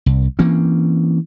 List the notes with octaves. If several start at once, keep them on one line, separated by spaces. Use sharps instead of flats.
C2
E3 A#3 C4 C#4